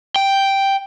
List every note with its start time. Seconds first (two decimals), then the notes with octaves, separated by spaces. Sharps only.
0.16 G5